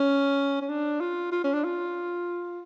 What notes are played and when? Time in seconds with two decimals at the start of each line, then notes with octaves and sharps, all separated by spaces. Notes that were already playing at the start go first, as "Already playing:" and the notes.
Already playing: C#4
0.61 C#4
0.69 D4
1.00 F4
1.32 F4
1.44 C#4
1.53 D4
1.64 F4